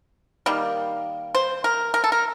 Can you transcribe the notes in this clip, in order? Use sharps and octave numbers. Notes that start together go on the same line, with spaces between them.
D#3 G3 A#3
C5
A#4
A#4
A4
A#4